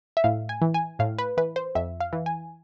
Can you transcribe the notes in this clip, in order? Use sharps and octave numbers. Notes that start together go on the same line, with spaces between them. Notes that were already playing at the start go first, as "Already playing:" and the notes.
E5
A2 F5
G#5
E3
G#5
A2 F5
B4
E3 B4
C5
F2 E5
F5
E3
G#5